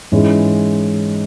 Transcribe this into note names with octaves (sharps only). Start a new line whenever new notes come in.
G#2 E3 G#3 C#4